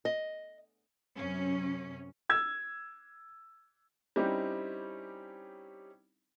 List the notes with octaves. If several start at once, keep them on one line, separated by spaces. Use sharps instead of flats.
D#5
F#2 C3 C#4
E6 G#6
G3 C4 C#4 D#4 E4 G4